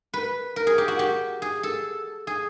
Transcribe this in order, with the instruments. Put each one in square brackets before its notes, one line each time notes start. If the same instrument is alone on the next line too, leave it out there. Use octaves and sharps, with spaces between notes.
[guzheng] B4
A#4
G#4
G4
F#4
G4
G#4
A4
G#4